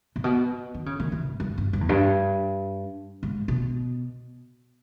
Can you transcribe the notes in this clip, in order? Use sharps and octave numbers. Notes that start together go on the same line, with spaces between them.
A#2
B2
D#3
C#3
D#3
E3
G#2
G2
G2
G2
E2
G2
G#2
B2